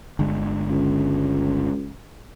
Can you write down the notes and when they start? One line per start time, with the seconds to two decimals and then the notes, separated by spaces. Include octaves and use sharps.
0.19 G1 D3 G#3
0.70 C#2